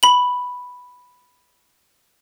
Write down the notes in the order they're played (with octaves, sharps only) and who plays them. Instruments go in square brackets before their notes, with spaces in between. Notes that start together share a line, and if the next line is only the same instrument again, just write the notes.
[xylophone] B5 F#7